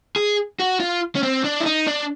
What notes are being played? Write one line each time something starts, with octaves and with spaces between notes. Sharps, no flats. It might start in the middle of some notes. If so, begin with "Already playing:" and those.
G#4
F#4
F4
C#4
C4
D4
E4
D#4
D4